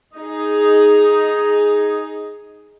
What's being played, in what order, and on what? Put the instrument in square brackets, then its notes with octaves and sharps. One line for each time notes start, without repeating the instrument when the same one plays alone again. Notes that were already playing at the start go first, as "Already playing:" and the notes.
[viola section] D#4 G#4